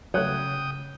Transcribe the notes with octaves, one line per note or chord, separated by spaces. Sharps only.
C#3 F#3 A3 C#5 G5 D#6 F#6